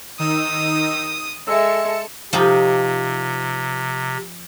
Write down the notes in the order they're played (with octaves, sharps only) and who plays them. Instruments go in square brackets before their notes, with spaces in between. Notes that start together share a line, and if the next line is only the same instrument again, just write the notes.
[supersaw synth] D#3 D#4 E6 [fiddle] D#6
[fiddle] G#3 [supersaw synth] A4 C#7 E7 [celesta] E5 E6
[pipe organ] C3 [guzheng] F3 D#4 G4